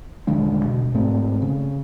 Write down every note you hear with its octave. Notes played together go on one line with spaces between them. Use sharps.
D#1 D3 G#3 D4
B2
G#2 A3 C4
C#3